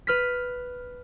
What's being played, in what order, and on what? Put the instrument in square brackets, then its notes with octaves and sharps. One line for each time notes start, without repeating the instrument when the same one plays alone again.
[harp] B4 F6 B6